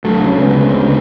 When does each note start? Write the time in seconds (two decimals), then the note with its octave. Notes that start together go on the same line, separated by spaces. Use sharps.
0.04 D2 F#3 A3
0.22 C#3
0.39 D2 G#3 B3
0.57 C#3
0.75 D2